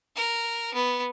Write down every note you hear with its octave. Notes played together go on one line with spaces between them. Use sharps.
A#4
B3